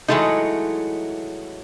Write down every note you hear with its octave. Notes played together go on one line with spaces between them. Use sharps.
E3 F#3 G#3 A3 D#4